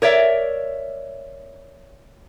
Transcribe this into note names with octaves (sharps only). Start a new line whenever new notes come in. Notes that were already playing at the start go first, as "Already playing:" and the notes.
A#4 C#5 D5 E5